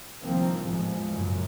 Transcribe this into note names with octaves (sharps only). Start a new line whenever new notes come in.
C2 D#3 F3 A#3 C4
A1 E2 G#2 F3 G#3
G#1 C#2 F#2 A#2